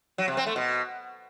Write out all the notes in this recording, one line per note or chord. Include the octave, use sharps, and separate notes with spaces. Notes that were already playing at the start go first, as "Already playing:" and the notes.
F#3
C3
C4
A3
B2